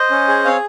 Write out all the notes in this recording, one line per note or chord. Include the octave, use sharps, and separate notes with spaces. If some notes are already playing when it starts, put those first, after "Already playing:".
Already playing: C5 D#5
C#4
G#4
C4 C#5 F5